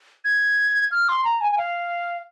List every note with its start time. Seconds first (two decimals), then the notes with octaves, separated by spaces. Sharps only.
0.25 G#6
0.91 F6
1.09 C6
1.25 A#5
1.41 G#5
1.52 G#5
1.58 F5